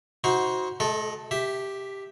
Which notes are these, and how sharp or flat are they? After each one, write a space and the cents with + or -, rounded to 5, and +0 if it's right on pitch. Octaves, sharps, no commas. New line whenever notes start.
D#4 +35 F#4 +0 C5 +0
A3 -45 A4 +0 D#5 +0
G4 +0 E5 +0